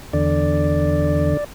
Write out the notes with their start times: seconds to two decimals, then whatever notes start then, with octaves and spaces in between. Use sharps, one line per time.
0.13 E2 D3 D5